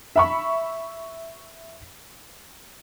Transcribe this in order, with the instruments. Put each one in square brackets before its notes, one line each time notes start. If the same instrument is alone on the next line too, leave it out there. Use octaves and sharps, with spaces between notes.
[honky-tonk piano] E5 B5 C#6